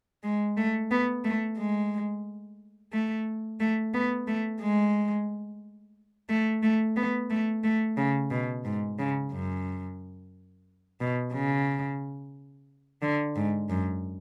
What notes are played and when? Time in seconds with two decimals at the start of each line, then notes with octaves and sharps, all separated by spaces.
0.24 G#3
0.57 A3
0.91 B3
1.24 A3
1.58 G#3
2.93 A3
3.60 A3
3.94 B3
4.27 A3
4.61 G#3
6.29 A3
6.63 A3
6.96 B3
7.30 A3
7.64 A3
7.97 C#3
8.31 B2
8.65 G#2
8.99 C#3
9.33 F#2
11.00 B2
11.33 C#3
13.02 D3
13.36 G#2
13.70 F#2